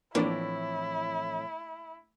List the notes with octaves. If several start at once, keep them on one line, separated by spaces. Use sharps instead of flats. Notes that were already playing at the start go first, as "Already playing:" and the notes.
A2 E3 F3 A#3 C4 D4 E4 D5